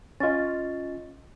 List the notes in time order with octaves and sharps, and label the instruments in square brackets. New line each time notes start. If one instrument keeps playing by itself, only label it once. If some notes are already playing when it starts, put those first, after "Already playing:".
[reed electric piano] C#4 F4 [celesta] D#5 C#6 A6